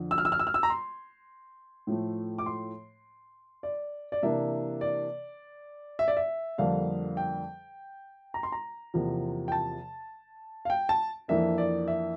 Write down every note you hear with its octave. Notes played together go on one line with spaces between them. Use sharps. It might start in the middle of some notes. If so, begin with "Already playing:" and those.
Already playing: F2 D3 F3
E6
F6
E6
F6
E6
F6
E6
A#5
C6
A2 F3 A3
D6
C6
D5
D5
C3 E3 A#3 D4 E5
D5
E5
D5
E5
F2 D3 G3 A#3 D4 F5
G5
A#5
C6
A#5
E2 C3 F3 A#3
G5
A5
F5
G5
A5
F2 E3 A#3 D4 E5
D5
E5